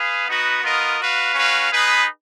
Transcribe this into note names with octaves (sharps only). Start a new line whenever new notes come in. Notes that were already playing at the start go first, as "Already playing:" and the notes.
Already playing: G#4 B4 F5
B3 D#4 F#4 B4
B3 F4 A#4 D#5
F#4 B4 F5
C#4 F#4 B4 F5
D#4 G#4 B4